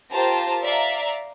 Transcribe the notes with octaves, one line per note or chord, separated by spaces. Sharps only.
F4 G4 A#4 C5 A5 A#5
D5 E5 F5 A#5